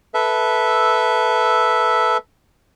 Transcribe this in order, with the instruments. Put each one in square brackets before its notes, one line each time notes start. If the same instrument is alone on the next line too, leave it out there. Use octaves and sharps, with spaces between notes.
[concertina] A4 B4 E5